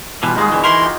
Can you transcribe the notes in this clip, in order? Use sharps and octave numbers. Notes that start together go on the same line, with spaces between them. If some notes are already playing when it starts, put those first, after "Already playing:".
B2 E3 G3 F4
D#2 D#3 G#3 F#4 G#4
E2 D3 E3
E3 E4 A#4 C6
F4 G4